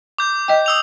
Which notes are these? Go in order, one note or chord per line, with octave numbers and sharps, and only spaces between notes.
D6 G6
D#5 G5
D#6 E6 F7